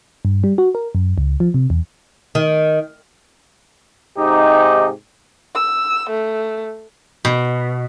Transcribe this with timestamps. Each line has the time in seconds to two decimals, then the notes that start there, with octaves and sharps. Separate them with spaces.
0.25 G2
0.44 G3
0.58 F#4
0.75 A#4
0.95 F#2
1.18 C#2
1.40 F3
1.54 C3
1.70 E2
2.35 D#3
4.17 G#2 C3 D#4 G4
5.55 E6
6.10 A3
7.25 B2